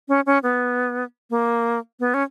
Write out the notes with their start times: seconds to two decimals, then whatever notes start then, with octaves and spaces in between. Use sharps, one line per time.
0.09 C#4
0.26 C#4
0.43 B3
1.30 A#3
2.00 B3
2.14 C#4